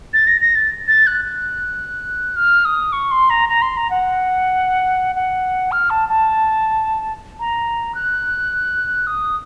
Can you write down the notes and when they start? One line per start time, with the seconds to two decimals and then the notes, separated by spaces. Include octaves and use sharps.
0.13 A6
0.27 A#6
0.41 A#6
0.55 A6
0.87 A6
1.06 F#6
1.25 F#6
2.36 F6
2.65 D#6
2.92 C#6
3.11 C6
3.30 A#5
3.49 A#5
3.62 C6
3.77 A#5
3.90 F#5
5.15 F#5
5.72 F6
5.90 A5
6.09 A5
7.39 A#5
7.95 F#6
9.07 D#6